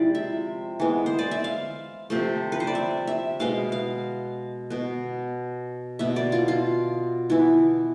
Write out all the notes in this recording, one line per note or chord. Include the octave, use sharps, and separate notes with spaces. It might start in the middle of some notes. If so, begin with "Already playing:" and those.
Already playing: C3 F3 G#3 E4 D5
E5
E3 G#3 B3
C5
D5
E5
F5
C3 F3 A3
B4
C5
D5
E5
E5
B2 G#3 B3 F5
F5
B2 B3
B2 B3 E5
D5
F4
F4
E3 B3 E4